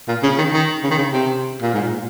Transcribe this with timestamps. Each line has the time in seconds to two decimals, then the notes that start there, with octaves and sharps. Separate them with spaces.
0.08 A#2
0.23 C#3
0.38 D#3
0.53 D#3
0.84 C#3
0.91 D#3
0.98 C#3
1.13 C3
1.62 A#2
1.74 G#2
1.82 A#2